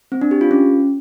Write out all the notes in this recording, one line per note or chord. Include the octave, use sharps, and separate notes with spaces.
C4
D4
G4
F4
C#4